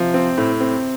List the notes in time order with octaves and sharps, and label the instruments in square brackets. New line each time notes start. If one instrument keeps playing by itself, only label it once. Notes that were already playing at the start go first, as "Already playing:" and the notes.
Already playing: [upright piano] C3 [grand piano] F3
[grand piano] C4
A2
C4